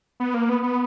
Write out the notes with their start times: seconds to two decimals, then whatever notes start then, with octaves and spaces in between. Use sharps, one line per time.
0.20 B3
0.34 A#3
0.49 B3
0.63 B3